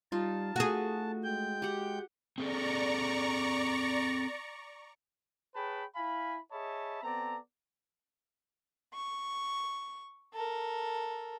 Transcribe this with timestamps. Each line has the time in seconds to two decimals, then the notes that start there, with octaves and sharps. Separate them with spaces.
0.12 G3 D#4 F4 A5
0.56 A3 F#4 G#4
1.24 G#3 G5 G6
1.62 G4 F#5
2.38 C4 G#4 A4 D5 A#5 C#6
5.55 G#4 B4 C#5 G5 A5 B5
5.95 E4 F5 G#5 B5
6.51 G#4 C#5 D#5 E5 A5 B5
7.03 B3 C4 A4 D5 A#5
8.94 C#6
10.34 A4 A#4